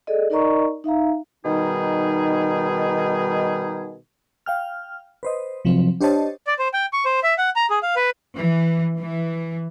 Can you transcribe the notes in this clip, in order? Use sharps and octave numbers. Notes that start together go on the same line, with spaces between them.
G#4 A4 D5 D#5
D#4 A#4 D5 D#5 A#5 C#6
D#4 E5 F5 A#5
B2 D#3 G3 D#4 G#4
F5 G5 F6
B4 C5 D#5
C3 F3 F#3 C4
D4 G4 C5 C#5 D#5 A5
D5
C5
G5
C#6
C5
E5
F#5
A#5
G#4
F5
B4
E3
E3